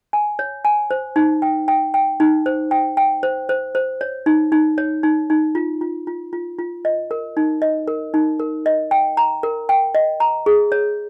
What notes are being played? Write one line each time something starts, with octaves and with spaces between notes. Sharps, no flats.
G#5
C#5
G#5
C5
D#4
G5
G5
G5
D#4
C5
G5
G5
C5
C5
C5
C#5
D#4
D#4
C#5
D#4
D#4
F4
F4
F4
F4
F4
D#5
A#4
D#4
D#5
A#4
D#4
A#4
D#5
G5
A#5
A#4
G5
D#5
A#5
G#4
C#5